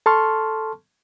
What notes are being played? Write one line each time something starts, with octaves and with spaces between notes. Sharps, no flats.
A4 A5 C6 C#6 F6